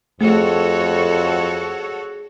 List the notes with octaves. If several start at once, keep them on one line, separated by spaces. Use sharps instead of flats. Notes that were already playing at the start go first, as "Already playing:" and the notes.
F2 A3 F#4 G#4 A4 C#5